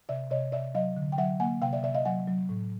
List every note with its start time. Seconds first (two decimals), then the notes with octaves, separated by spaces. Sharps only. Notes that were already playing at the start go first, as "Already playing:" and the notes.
0.09 C3 D5 E5
0.30 C3 C#5 D#5
0.52 C3 D5 E5
0.75 F#3 D#5 F5
0.97 D3
1.12 G5
1.18 F#3 E5 F#5
1.40 A#3 F#5 G#5
1.62 C3 F5 G5
1.73 D5 E5
1.83 C3 D5 E5
1.95 D#5 F5
2.05 F#3 F#5 G#5
2.27 F#3
2.49 A2